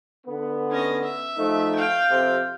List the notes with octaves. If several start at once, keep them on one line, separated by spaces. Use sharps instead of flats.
D3 B3
C#4 D#5
E5
F3 A3 D#4
F5 G5
F2 C3